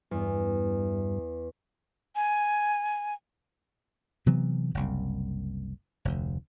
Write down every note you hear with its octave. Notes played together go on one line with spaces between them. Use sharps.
E2 G2
G#5
C3 E3 F#3 B3
F#1 C2
F1 D2